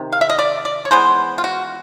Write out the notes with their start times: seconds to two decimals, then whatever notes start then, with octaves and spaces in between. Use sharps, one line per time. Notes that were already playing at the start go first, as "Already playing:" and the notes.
Already playing: C3 D#3
0.12 F5
0.21 E5
0.30 D#5
0.39 D5
0.65 D5
0.85 C#5
0.91 E3 G#3 B3 C5
1.38 F4
1.44 F#4